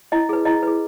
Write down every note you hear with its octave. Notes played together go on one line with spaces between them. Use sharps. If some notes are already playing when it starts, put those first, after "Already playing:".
E4 D#5
G#4 B4
E4 D#5
G#4 B4